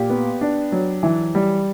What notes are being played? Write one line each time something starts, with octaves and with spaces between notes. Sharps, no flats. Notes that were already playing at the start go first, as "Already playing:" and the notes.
Already playing: A#2 G4
B3
D4
F#3
E3
G3